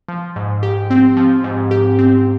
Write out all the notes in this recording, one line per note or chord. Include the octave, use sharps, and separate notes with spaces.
F3
G#2
G4
C4
F3
G#2
G4
C4